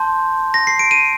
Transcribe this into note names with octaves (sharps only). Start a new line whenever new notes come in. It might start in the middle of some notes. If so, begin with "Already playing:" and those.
Already playing: A5 C6 G6
A#6
C7
D7
D#7